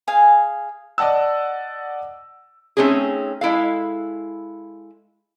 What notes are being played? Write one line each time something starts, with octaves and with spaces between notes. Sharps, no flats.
G#4 F5 G#5
D5 D#5 F#5 A5 E6
A3 C4 C#4 D#4 G#4
G#3 E4 A4 F5